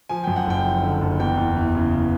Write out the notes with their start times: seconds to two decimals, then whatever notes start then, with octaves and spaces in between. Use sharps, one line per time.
0.09 F3 G#5
0.24 F#2 G5
0.36 F#5
0.46 F#1 G5
0.65 F3
0.83 D3
1.01 F#1
1.20 E2 G5
1.37 E2
1.56 E3
1.75 C#3